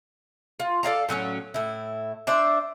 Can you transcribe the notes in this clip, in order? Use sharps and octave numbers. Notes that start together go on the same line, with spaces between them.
F4
A4 D5 F5 A#5
A2 F#3 C4 C#4
A2 E4
D4 C5 D5 E5